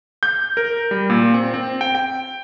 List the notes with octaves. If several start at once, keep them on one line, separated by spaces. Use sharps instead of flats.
G6
A#4
G3
A#2
C4
C4
G5
G5